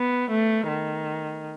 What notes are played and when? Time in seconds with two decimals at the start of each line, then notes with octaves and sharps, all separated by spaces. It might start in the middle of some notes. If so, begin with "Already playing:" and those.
Already playing: B3
0.30 A3
0.68 D#3